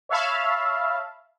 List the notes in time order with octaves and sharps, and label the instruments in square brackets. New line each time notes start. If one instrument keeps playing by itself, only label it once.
[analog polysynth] C#5 E5 F5 A5 B5